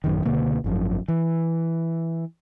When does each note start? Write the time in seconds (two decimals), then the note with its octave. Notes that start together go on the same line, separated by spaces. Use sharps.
0.04 A1 F#2 D#3
0.25 C#2 B2 D3 A#3
0.64 G#1 F#2 F3
1.08 E3